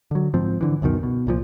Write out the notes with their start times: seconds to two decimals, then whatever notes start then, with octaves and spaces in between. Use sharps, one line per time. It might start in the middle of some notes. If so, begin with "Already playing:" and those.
0.11 D3 F#3
0.34 G#2 F3 C4
0.61 D3 E3
0.82 C#2 F#2 B2 D#3
1.03 B2
1.27 C2 A#2 F3